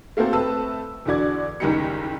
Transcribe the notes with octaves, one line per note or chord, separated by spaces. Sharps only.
A3 A#3 C4 F#4 A4 C5
A3 C4 B4 A5 E6
E2 D3 F#4 D5 G#6
F#1 D#2 G3 D#4 G4 C#7